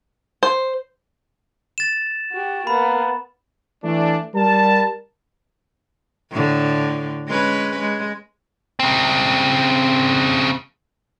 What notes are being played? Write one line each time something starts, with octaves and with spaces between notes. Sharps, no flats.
C5
A6 E7
F#4 G4
A#3 B3 B5
E3 A3 D4
G3 A#4 A5
A2 D3
G#3 C#4 B4
G#3
C#3 C4